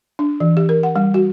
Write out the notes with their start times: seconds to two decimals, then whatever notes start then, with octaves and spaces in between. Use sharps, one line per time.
0.19 D4
0.40 E3
0.57 G4
0.69 A#4
0.83 F#5
0.96 G3
1.14 F#4